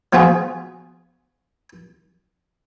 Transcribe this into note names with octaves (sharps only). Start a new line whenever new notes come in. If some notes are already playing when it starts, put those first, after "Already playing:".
F3 B3 F4 F#4 G#4